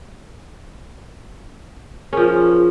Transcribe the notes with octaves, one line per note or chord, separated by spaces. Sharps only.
F3 C#4 G#4 A#4